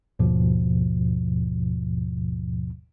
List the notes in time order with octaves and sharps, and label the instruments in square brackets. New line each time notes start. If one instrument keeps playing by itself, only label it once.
[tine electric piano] G1 D#2 G#2 B2 F3